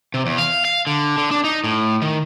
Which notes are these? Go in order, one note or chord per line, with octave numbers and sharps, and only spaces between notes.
C3
E2
F5
F5
D3
D3
D4
D#4
A2
D#3